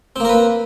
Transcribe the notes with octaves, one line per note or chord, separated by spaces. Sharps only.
A#3 C4 A#4 B4